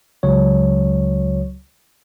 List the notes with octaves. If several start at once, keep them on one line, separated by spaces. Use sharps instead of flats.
C#2 F#3 C#5